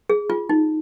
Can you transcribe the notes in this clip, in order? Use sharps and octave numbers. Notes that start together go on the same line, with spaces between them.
G#4
F4
D#4